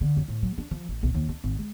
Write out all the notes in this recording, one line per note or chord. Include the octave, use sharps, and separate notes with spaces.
D3
F#2
A2
F#3
D4
F3
A1
B1
D#2
D4
G#1
G#3